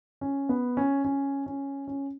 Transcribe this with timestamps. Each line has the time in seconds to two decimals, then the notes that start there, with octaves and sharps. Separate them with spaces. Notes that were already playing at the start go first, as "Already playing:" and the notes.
0.21 C#4
0.49 B3
0.77 C#4
1.05 C#4
1.46 C#4
1.87 C#4